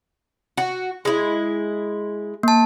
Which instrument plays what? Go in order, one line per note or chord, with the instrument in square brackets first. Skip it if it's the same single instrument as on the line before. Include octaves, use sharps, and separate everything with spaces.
[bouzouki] F#4
G#3 E4
[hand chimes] A#3 A5